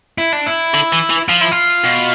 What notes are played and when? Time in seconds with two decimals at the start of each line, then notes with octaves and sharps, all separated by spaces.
0.18 E4
0.33 D4
0.47 E4
0.74 D3
0.93 E3
1.10 E3
1.28 F3 F4
1.41 E4
1.51 F4
1.84 B2